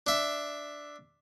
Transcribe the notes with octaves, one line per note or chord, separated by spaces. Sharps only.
D4 E5